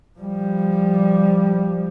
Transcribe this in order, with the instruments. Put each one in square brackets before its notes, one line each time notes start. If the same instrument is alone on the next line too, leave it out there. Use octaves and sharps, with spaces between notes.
[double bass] F3 G3